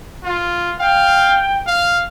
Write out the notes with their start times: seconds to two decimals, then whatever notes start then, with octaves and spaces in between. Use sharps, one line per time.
0.24 F4
0.79 F5 G5
1.67 F5